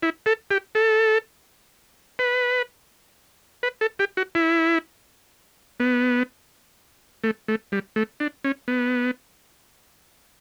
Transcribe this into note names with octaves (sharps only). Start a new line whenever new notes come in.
E4
A4
G4
A4
B4
B4
A4
G4
F#4
E4
B3
A3
A3
G3
A3
D4
C#4
B3